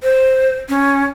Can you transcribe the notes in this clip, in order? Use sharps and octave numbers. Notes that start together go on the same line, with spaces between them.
C5
C#4